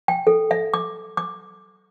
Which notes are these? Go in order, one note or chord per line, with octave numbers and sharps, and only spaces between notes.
G5
A4
E5
D6
D6